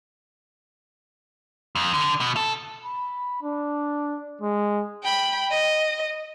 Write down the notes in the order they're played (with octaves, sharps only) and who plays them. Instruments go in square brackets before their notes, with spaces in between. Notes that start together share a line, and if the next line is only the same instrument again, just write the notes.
[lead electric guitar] F2
D3
B2
A4
[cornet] B5
D4
G#3
[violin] G5 B5
D#5